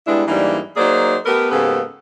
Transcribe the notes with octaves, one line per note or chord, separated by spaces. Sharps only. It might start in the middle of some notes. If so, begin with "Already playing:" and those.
G3 G#3 B3 D4 E4
G#2 E3 G3 A#3 D4 D#4
F#3 A#3 D#4 G#4 C5 D5
A3 B3 G4 A#4 B4
G#2 C#3 A#3 B3 G4 A4